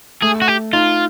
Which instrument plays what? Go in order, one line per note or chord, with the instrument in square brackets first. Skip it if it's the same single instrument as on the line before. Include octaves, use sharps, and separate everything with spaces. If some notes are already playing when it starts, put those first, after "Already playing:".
[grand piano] A3 [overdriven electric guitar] G#4
[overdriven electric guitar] F#4
G4
[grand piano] D#4 [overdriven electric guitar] F4